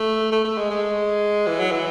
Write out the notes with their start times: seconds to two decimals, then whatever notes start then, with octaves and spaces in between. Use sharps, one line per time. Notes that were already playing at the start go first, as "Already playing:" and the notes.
Already playing: A3
0.32 A3
0.45 A3
0.58 G#3
0.70 G#3
1.47 E3
1.59 F#3
1.71 E3